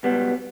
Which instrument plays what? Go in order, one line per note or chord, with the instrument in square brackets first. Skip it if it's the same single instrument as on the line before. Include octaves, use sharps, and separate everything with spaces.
[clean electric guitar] C#2 B2 G3 B3